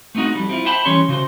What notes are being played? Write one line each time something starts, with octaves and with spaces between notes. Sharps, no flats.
A3 B3 C4 D#4 F#4
F2 G3
C4 E4 F4
C5 E5 G5 A5 B5
E3 G3 C#4 G4 C#5 C6
C#3 F#4 C5